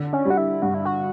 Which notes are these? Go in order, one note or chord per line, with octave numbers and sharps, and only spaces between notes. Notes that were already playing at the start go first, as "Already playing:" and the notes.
Already playing: D3
C#4
G3
F#4
E4
G2 F#4
E4
F#4